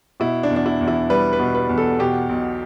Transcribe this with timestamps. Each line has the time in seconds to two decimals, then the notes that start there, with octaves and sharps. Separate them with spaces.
0.20 B2 E4
0.43 D4
0.51 E2
0.56 D4
0.66 E4
0.81 E2
0.88 E4
1.10 G3 B4
1.33 B4
1.39 B2
1.55 B4
1.69 E2
1.78 A4
1.99 B2 G4
2.29 B1